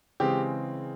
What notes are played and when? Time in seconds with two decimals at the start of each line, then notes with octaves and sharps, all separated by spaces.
0.20 C#3 E3 G#3 C4 G4